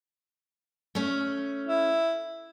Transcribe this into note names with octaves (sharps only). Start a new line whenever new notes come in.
A3 C#4
E4